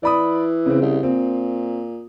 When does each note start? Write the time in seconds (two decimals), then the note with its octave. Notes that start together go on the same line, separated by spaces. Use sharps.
0.03 E3 D5 B5 D#6
0.66 C#3 C4
0.82 C2
1.03 A#2 C4